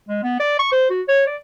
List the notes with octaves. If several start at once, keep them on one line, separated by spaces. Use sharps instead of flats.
G#3
B3
D5
C#6
C5
F#4
C#5
D5